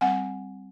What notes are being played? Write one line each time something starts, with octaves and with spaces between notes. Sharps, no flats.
G3 C4 F#5 G#5